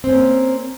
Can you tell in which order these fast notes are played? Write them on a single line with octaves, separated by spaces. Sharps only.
C4 C#4 A#3